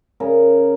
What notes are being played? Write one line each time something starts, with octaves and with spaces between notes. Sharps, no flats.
C#3 A#4